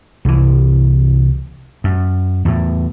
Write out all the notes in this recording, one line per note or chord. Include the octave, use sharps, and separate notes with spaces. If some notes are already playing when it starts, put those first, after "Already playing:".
C2 E3
F#2
E2 A2